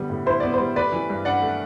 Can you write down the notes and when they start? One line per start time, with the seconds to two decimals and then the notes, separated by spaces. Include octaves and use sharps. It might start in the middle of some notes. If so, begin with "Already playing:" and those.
Already playing: D3 G3 B3
0.10 A2
0.26 E4 C5
0.40 B3 D5
0.54 C5
0.60 G3
0.76 A3 B4 D5
0.92 E3
1.10 G2
1.25 D4 D5 F#5
1.42 A3